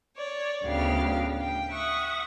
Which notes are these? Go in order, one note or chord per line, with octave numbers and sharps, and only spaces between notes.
C#5 D5
D2 A2 C#3 B3 G4 F5
G5
E5 F#5 C#6 D#6